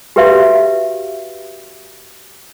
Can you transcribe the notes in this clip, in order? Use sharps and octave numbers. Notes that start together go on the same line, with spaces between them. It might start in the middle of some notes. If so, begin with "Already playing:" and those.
F#4 G4 B4 E5 F5